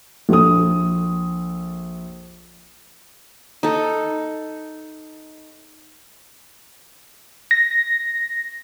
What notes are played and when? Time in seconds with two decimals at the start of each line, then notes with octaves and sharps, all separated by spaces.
0.29 A#1 A4 D#6
3.63 D#4 A4
7.51 A#6